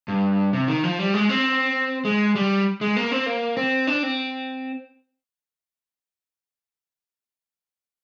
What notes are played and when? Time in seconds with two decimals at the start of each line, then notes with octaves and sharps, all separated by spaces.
0.08 G2
0.53 C3
0.68 D#3
0.84 F3
0.99 G3
1.14 G#3
1.29 C4
2.05 G#3
2.35 G3
2.81 G#3
2.96 A#3
3.11 C4
3.26 A#3
3.57 C4
3.87 D4
4.03 C4